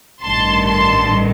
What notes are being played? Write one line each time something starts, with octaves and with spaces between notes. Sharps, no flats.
A1 G2 D#3 A5 C6
A5 C6